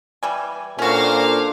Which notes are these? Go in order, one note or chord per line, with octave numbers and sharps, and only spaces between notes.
E3 G3 G#5
A#2 C#4 D4 F#4 A4 C5 F5